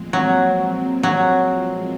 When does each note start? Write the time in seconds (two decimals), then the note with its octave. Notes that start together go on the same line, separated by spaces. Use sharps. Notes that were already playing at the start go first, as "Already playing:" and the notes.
Already playing: A#2 F3 G#3 C4
0.13 F#3
1.03 F#3